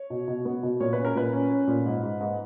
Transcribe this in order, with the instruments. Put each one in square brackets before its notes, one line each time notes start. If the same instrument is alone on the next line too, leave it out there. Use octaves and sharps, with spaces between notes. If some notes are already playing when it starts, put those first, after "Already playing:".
Already playing: [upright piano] C#5
B2
B2
B3
B2
A#2 C#5
C#4 B4
A#4
A#2 B4
C#4
C#4
A#2
G#2
G#2
G#2